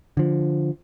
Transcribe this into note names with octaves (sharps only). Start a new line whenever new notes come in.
D3 F3